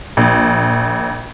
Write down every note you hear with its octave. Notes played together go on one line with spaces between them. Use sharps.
A#1